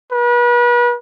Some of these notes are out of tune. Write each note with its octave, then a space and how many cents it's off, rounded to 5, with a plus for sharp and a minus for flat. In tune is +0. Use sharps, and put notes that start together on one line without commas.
B4 -35